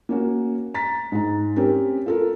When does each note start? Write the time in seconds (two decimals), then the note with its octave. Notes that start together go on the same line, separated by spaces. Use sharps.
0.09 A#3 C#4 F#4
0.74 A#5 A6 B6
1.12 G#2 D#4 A#5
1.56 C4 C#4 G4 A#4
2.06 F4 A4 A#4